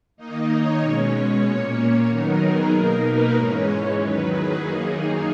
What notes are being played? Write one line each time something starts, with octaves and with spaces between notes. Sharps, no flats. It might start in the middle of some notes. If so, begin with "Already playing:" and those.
D#3 A#3 D#4 D#5
C#5
B2 G#3 C#4
A#2 A#3 C#4
D#3 F#3 B3 D#4 A#4
G#4
B2 A#3 D#4 A#4
B4
G#2 E3 G#3 C#4 C#5
E2 D#3 F#3 B4
G#4
F#2 D#3 A#3 D#4